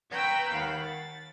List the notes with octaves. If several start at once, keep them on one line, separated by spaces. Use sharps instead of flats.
B4 G5 A#5 C#6 E6 F#6
D#2 F5 F#5 B5
A6